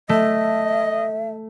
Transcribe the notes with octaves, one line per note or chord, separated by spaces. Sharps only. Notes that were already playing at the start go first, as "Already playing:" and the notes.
A3 D#5 E5